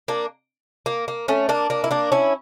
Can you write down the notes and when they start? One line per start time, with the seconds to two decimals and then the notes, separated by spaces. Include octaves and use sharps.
0.08 A#3 D4
0.86 A#3
1.08 A#3
1.28 A3 C#4
1.49 A#3 D4
1.70 A#3 D4
1.84 E4
1.91 A#3 D4
2.12 C#4 E4